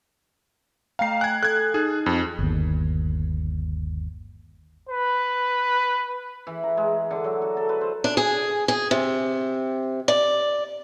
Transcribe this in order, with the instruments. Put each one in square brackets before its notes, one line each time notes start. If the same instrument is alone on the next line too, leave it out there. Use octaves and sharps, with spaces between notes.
[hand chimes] A3 G5 A#5 [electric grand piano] F5 C7
[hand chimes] G#5 [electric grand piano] F#6 G#6
[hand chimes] A4 [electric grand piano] F#6 G#6
[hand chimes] D#4 [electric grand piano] G#4
[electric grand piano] F2
[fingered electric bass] G1 D#2
[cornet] B4
[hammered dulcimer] E3
A#5
G#3
D3
F#3
F#4
A4
B4
C5
[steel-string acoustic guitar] D4
G#4
G#4
C3
D5